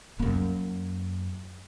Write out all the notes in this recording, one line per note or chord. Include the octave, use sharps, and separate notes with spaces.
F#2 A#3